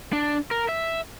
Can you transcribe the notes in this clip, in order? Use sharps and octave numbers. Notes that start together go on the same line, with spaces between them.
D4
A#4
E5